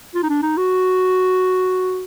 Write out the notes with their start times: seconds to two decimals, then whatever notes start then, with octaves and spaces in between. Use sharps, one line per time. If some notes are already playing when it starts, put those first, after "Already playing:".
0.15 F4
0.23 D#4
0.29 D4
0.43 D#4
0.57 F#4